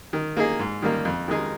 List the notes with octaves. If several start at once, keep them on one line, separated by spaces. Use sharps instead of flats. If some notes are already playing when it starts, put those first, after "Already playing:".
D#3
A#3 D#4 G#4
G#2
D#3 G3 A#3
F2
D#3 G#3 D#4 G#4